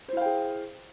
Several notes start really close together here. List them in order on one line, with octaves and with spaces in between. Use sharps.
C5 E4 F5 G5 G#4